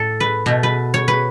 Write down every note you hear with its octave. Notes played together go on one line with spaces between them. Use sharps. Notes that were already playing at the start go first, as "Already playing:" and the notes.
Already playing: A2 A4
B4
B2 A3
B4
C#5
B4